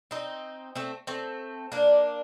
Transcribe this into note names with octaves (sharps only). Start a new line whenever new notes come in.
C4 D#4
A3 C4
A3 C4
A#3 D4